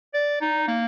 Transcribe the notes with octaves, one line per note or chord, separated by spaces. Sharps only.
D5
D#4
A#3